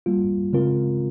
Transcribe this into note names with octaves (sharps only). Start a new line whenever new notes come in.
G3 A#3 F4
C#3 G#3 C4 F4 A#4